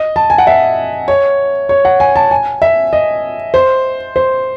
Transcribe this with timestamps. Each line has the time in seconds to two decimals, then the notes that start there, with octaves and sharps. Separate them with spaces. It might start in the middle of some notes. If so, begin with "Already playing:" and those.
Already playing: D#5
0.16 A5
0.30 G#5
0.38 F#5
0.47 E5
1.08 C#5
1.69 C#5
1.85 F#5
2.00 G#5
2.16 A5
2.31 G#5
2.62 E5
2.93 D#5
3.54 C5
4.16 C5